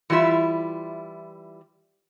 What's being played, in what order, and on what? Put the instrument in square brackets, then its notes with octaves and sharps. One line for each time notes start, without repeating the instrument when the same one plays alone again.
[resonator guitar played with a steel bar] E3 G3 E4 F4 E5